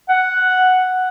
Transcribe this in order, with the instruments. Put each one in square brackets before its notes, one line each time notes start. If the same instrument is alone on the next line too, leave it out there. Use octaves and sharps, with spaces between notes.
[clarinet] F#5